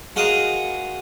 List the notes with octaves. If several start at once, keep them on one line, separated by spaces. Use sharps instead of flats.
G#3 F4 F#4 A#4 C#6 D#6